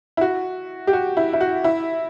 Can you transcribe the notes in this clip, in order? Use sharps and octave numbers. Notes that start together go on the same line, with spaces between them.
E4
F#4
G4
F#4
E4
E4
F#4
E4